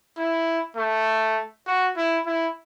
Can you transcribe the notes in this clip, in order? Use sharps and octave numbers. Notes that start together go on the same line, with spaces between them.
E4
A3
F#4
E4
E4